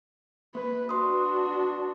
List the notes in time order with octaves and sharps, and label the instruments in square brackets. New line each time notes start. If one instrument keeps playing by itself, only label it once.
[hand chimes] A#3 [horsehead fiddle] B4
[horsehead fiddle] D4 F#4 [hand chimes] B4 C6 D#6